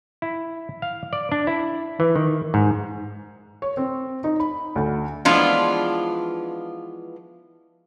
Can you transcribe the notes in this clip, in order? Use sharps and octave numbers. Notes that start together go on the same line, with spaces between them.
E4
F5
D5
D4
E4
E3
D#3
G#2
C#5
C4
D#4
B5
D2
E3 F3 G#3 B3 D4 F4